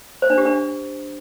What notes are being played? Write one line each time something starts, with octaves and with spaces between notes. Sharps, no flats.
C5
D4
G4
D4